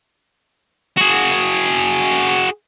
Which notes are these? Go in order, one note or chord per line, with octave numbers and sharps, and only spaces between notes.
F#4 G#4